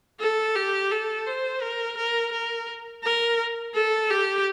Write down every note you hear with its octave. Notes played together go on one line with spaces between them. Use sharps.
A4
G4
A4
C5
A#4
A#4
A#4
A#4
A4
G4